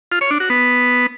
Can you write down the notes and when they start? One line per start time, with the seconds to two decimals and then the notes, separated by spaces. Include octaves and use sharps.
0.12 F4
0.21 C#5
0.31 D4
0.40 F#4
0.50 B3